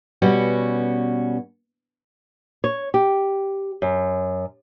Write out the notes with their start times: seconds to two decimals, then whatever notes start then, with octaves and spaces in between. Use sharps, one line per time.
0.22 B2 G3 C#4 F#4
2.64 C#5
2.94 G4
3.82 F#2